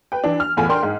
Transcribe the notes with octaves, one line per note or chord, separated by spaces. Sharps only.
B4 G5
E3 D4
F6
E2 A2 F4 G#5 B5
D4 A#4 G5 C6
G#2